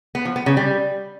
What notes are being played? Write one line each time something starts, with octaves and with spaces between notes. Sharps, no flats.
B3
F3
B3
C#3
G3